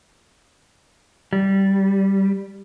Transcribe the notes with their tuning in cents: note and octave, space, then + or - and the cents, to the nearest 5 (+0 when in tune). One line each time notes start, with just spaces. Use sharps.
G3 -10